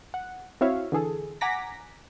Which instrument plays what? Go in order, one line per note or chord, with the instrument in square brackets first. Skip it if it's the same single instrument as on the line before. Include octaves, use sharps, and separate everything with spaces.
[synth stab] F#5
C4 E4 F#4 C#5 E5 F5
D3 E3 G#4 A4
F#5 G#5 A#5 D6 A#6 B6